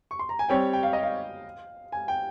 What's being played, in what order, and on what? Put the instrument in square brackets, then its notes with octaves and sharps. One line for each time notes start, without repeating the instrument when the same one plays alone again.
[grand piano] C#6
C6
A#5
G#5
[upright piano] G3 C4 G4 C#5 [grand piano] G5
[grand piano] G5
F5
D#5
F5
G#5
G5